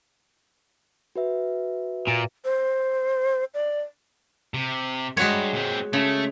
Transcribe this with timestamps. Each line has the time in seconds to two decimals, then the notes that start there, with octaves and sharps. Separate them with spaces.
1.16 F#4 B4 E5
2.07 A#2
2.45 C5
3.54 D5
4.54 C3
5.17 G2 G#3 F#4 C#5
5.53 A#2 C4
5.93 C#3 A3